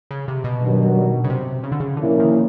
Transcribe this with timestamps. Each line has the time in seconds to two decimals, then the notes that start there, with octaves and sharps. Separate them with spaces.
0.11 C#3
0.28 C3
0.44 B2
0.62 G2 D#3 F#3
1.24 C#3
1.30 C3
1.63 C#3
1.72 D3
1.80 C#3
1.97 A#2 D3 F3 A#3 C#4 E4
2.20 D#3